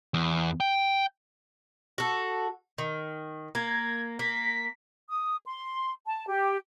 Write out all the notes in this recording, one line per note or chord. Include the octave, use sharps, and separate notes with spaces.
E2
G5
F#4 A4
D#3
A#3 G#6
A#3 B6
D#6
C6
A5
G4